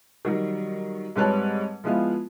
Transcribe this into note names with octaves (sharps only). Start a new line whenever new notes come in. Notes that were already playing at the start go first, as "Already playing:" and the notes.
D#3 F#3 G3
G#2 G3 C4 B4 C#5 A5
F3 G#3 B3 E4 F4